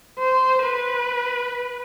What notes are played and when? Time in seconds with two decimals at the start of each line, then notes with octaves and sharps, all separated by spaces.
0.19 C5
0.63 B4